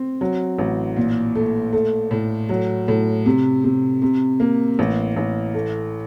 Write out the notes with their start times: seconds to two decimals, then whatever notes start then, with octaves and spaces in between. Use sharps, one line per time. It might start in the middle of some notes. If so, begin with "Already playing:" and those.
Already playing: C4
0.21 F#3
0.58 A1
0.96 A#2
1.35 A3
1.73 A3
2.11 A2
2.49 F#3
2.88 A2
3.26 C3
3.64 C3
4.02 C3
4.40 A#3
4.79 A1
5.16 A1
5.54 A3